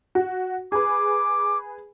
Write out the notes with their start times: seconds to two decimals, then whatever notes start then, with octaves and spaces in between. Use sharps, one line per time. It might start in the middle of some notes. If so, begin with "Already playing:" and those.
0.15 F#4
0.72 G#4 B4 D6